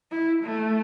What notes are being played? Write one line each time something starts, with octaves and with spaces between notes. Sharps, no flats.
E4
A3